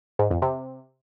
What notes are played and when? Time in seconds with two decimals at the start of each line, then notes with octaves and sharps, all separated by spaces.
0.19 G#2
0.31 F2
0.42 C3